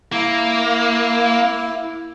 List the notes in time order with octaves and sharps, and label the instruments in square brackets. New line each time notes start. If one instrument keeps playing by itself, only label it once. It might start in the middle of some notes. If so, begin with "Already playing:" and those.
[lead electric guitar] A#3 [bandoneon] E4